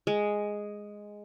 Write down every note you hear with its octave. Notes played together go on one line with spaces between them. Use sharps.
G#3